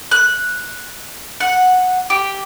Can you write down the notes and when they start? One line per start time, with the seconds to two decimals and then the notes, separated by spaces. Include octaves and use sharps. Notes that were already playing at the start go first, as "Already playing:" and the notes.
0.11 F#6
1.40 F#5
2.10 G4